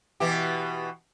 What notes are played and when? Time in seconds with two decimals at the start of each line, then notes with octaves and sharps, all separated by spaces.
0.20 B2 E3 G4